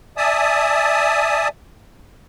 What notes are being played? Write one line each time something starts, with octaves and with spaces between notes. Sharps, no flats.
D5 E5 G#5 A5 D#6